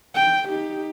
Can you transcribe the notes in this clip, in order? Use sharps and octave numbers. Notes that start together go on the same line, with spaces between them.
G5
D#4 G4